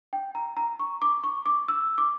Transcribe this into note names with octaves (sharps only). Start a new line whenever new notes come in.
G5
A#5
A#5
C#6
D6
C#6
D6
E6
D6